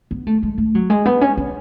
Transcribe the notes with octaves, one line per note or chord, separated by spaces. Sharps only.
B3
A3
G#3
A3
F#3
G#3
B3
C#4
C#4